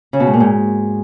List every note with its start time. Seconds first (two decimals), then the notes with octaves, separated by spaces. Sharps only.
0.13 C#3
0.20 B2
0.27 G#2
0.33 A#2
0.40 G#2